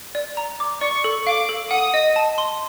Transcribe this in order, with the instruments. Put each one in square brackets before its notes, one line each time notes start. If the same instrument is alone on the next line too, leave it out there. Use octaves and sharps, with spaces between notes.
[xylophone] D5
A#5
D6
[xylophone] D5 [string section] C#6
[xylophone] A4
[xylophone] F5 [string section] D6
[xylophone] A4
[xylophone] F#5 [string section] D#6
[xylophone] D#5
A5
C6